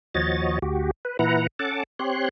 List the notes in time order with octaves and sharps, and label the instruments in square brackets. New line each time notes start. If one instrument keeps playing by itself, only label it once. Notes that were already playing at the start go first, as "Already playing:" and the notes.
[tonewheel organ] D#2 F3 F#4 C#5 D#5 A6
D2 F#4 G4
B4
A#2 E3 E4 B4 F#5 A#5
C#4 A4 F#5 A5 D6
C4 G4 C#5 C6 F#6